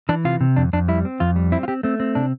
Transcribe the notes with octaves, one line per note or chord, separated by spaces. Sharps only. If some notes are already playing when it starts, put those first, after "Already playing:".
E3 D4
C3 F4
C3
F2 D4
F2 D4
G3 E4
C4
F2 F4
G3
C4 E4
F4
C4 G4
A3 C4
C4
C3 D4